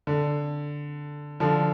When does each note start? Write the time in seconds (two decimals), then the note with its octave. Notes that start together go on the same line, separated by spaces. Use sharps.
0.07 D3
1.40 D3 F3